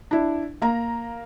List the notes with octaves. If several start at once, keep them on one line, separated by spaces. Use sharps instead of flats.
D4 E4
A#3 A#5